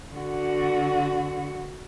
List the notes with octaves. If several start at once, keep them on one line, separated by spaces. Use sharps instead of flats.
D3 F#4